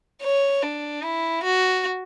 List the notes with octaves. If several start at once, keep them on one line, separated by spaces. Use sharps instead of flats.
C#5
D4
E4
F#4